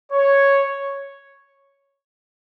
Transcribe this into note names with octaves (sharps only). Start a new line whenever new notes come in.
C#5